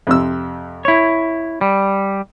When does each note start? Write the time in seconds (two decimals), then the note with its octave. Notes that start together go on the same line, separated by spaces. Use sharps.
0.07 F2 C3 E6
0.85 E4 C#5
1.61 G3